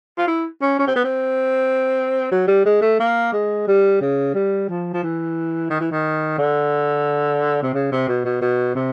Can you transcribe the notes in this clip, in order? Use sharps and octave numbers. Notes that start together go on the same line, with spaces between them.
F4
E4
C#4
C#4
C4
B3
C4
F#3
G3
G#3
A3
A#3
G#3
G3
C#3
G3
F3
F3
E3
D#3
E3
D#3
D3
C3
C#3
C3
B2
B2
B2
C3